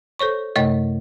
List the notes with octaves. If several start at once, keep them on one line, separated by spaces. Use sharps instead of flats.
A4 C5 C#5 C#6
F#2 C3 A3 C#5 D#5